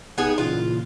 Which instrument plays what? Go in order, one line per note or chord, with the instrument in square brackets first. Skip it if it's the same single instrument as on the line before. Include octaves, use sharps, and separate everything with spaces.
[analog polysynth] G#1 D#4 G5 [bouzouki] B3 G#4
[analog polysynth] A#2 C#3 E3 [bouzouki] F4